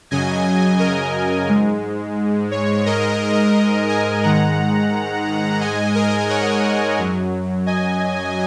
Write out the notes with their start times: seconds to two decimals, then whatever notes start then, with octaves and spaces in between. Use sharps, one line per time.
0.11 F#2 C#3 F#3 D#5 G#5
0.79 A#4 D#5
1.48 G#2 G#3
2.51 C#5
2.86 G#2 G#3 A#4 D#5
3.89 D#5 G#5
4.23 G#2 D#3 G#3 F#5 A#5
5.60 G#2 G#3 D#5 G#5
5.95 A#4 D#5
6.29 C#5 F#5
6.98 F#2 F#3
7.66 D#5 G#5